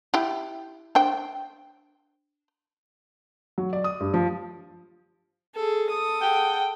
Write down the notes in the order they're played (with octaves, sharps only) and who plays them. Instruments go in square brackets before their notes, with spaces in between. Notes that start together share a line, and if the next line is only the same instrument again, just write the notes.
[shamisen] E4 G4
D4 C5 G5
[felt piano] F#3
D5
D#6
G2
F3
[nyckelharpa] G#4 A4
A4 D#6
[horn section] G#4 F#5 G5